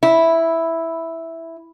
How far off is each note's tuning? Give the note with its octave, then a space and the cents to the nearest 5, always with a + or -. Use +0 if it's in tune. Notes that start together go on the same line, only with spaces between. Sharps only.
E4 -5